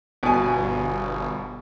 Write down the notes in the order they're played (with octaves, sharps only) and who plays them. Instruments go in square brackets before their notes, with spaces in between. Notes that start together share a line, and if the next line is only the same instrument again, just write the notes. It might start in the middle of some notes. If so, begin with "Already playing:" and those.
[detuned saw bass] G1 [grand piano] B2 G#5